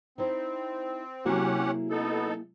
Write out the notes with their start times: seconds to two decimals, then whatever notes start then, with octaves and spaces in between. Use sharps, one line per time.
0.18 C4 D#4 E4 C5
1.26 C3 F#3 A#3 C#4 E4 G4 G#4 F#5
1.90 B3 D#4 A4